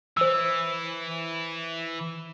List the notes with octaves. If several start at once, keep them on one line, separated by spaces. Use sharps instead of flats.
E3 C5 E6